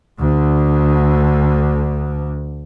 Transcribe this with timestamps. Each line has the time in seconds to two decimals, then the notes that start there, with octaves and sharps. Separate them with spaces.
0.19 D2 D3